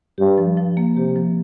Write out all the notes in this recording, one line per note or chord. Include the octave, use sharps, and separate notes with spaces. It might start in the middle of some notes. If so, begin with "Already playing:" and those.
G2 G4
F3
F3
A#3
C3 G4
F3